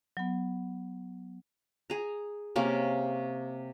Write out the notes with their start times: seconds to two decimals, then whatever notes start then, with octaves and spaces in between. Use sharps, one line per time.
0.17 F#3 B3
1.90 G#4 A#5
2.56 C3 A#3 C#4